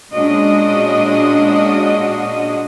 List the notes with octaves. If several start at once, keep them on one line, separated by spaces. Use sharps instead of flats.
A#2 G#3 C#4 D4 F#4 D#5